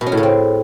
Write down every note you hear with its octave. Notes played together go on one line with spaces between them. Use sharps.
B2
C#4
A2
C#3
C4